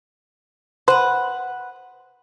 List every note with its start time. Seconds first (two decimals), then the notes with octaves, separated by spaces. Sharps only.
0.88 B4 C5 F#5